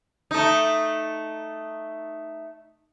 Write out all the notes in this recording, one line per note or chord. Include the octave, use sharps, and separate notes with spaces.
A3 D#4